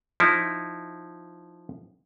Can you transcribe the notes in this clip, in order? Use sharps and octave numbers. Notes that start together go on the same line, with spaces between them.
F3 D#4 E4